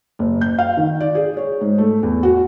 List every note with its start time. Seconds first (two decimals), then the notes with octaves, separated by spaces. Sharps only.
0.19 F#1
0.41 G6
0.59 F5
0.77 D#3
1.00 D5
1.15 G#4
1.37 C#5
1.61 G#2
1.78 A3
2.03 E2
2.23 F#4